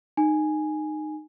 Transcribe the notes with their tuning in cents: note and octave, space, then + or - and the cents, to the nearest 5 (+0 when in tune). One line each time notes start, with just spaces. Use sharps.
D#4 -20 G#5 +0